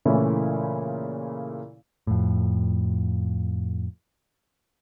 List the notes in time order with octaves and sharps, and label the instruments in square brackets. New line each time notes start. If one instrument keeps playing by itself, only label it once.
[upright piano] A#2 C#3 E3 A3 E4
[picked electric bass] F2 A2